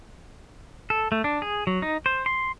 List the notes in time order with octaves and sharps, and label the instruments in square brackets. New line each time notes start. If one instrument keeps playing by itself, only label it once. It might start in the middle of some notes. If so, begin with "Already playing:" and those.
[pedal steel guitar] A4
A3
D4
G#4
F#3
D#4
C5
C6